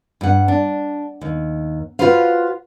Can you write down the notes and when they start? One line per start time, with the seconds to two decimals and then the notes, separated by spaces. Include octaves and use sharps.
0.21 G2 F#5
0.48 D4
1.21 D#2
1.99 F4 F#4 B4 C5 F5